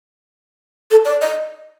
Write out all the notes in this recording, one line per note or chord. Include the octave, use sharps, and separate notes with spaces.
A4
D5
D#5